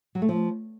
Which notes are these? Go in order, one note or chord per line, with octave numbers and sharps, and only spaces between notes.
F#3
A3
F3